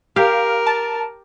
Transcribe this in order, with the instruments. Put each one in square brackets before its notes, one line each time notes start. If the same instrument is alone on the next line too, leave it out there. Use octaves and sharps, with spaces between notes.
[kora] G4 [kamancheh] A#4 [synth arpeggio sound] F5
[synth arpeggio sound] A5